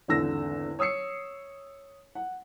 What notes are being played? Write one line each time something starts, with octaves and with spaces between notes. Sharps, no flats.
G#1 E2 D3 E6 A#6
C#5 D#6 E6 C7 C#7
F#5